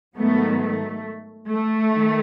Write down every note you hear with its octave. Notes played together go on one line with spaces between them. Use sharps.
G#2 D#3 F#3 A3 B3
A3
A3
D#3